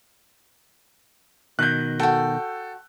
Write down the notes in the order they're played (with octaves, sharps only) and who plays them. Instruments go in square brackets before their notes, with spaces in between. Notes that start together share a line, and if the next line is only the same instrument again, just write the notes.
[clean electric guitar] B2 D#3 [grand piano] F#6 G6
[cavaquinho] F#4 G5 [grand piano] A4